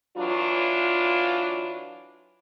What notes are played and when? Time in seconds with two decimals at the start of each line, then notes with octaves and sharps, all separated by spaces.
0.17 E3 F#3 D4 F4